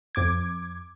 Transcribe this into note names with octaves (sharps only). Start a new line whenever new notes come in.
F2 D6 G#6